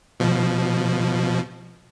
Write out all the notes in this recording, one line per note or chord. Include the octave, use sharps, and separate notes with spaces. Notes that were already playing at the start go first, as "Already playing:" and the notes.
B2 F3